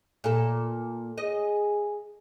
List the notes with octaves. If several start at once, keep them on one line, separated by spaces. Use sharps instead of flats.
A#2 A4
G#4 D#5